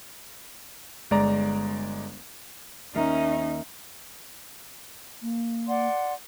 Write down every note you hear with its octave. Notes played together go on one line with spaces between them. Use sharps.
G1 G#3 D5 A#5
D#2 C#4 D#4 A#4 E5
A#3
D5 F#5 C6